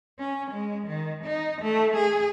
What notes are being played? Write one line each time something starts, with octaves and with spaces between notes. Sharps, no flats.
C#4
G#3
D#3
D#4
A3
G#4